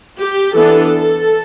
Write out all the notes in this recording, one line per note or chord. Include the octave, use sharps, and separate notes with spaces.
G4
E3 B3 D4 A4